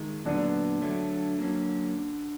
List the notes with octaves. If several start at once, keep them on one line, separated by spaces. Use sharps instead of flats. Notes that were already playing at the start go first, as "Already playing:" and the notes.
Already playing: D#3 G#3
A#2 D3 F#3 B3 D4
D3 F#3 A3
F#3 A#3 C#4